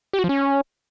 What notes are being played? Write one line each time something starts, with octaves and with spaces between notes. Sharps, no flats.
G4
F#4
F3
C#4